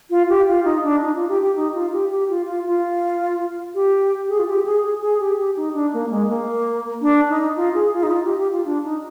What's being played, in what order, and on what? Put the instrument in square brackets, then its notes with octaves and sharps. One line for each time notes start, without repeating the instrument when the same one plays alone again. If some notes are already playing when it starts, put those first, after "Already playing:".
[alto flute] F4
G4
F4
D#4
D4
D#4
F4
G4
G4
D#4
F4
G4
G4
F4
F4
F4
G4
G#4
F4
G4
G#4
G#4
G#4
G4
G4
D#4
D4
A#3
G#3
A#3
D4
D#4
F4
G#4
F4
D#4
F4
G4
G4
F4
D4
D#4